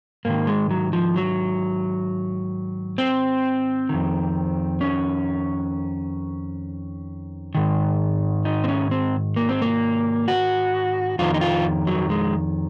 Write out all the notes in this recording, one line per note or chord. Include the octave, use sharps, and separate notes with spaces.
G#2 D#3 A#3
G#3
F#3
F3
F#3
C4
F2 D#3
C#4
G#2 D#3
D#4
C4
C#4
C4
A#3
C4
A#3
F#4
F2 D#3 F4
D#4
F4
F#3
G#3